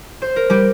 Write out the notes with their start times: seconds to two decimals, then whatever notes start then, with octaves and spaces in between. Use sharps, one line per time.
0.22 C5
0.36 A#4
0.50 G3 G4